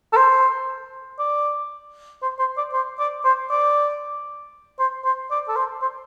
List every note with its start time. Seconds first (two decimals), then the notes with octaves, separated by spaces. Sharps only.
0.13 A4
0.17 C5
1.19 D5
2.23 C5
2.39 C5
2.57 D5
2.73 C5
3.00 D5
3.25 C5
3.51 D5
4.79 C5
5.05 C5
5.31 D5
5.48 A4
5.56 C5
5.82 C5